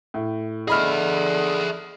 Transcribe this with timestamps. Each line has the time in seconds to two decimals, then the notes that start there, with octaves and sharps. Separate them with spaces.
0.14 A2
0.68 D3 G#4 D#5 E5 B5 F6